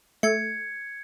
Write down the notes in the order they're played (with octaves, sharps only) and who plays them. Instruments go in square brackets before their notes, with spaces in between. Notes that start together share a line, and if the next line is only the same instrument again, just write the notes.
[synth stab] A3 [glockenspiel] G#6 C#7